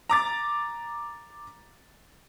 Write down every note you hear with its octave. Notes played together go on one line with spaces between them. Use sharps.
A#5 D6 A6